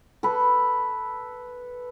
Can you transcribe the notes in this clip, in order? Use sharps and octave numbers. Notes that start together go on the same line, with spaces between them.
A4 B4